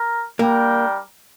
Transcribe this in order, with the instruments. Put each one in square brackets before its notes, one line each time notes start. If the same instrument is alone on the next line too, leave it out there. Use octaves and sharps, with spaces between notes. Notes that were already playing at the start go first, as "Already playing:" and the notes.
Already playing: [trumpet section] A#4
[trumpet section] G3 D4 A#4 G5 [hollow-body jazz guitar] A#3